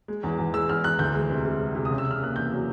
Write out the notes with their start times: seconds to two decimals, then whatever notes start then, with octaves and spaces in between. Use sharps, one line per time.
0.08 G#3
0.23 E2
0.38 E2
0.54 G#3 E6
0.69 E2 F6
0.84 E2 F#6
0.99 D2 G6
1.14 G#3
1.30 C3
1.45 C3
1.60 G#3
1.75 C3
1.85 D#6
1.90 C#3
1.98 E6
2.06 C#3 F6
2.21 A#3 F#6
2.36 E2 G6
2.52 F#3